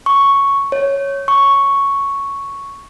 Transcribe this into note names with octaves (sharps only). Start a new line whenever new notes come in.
C#6
C#5
C#6